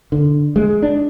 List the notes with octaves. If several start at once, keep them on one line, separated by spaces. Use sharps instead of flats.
D3
G#3
D4